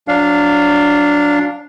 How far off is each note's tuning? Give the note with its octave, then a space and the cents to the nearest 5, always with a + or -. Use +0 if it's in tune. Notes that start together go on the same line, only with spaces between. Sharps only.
F#3 -25 D4 -10 F5 +0